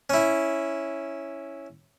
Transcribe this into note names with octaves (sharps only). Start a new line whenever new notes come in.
C#4 E4